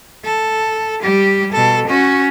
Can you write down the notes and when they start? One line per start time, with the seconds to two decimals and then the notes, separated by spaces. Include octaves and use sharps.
0.24 A4
1.02 G3 G4
1.52 B2 A4
1.87 C#4 F#4